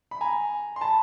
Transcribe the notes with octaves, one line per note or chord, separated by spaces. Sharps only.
B5
G#5 A#5
C6
A5 B5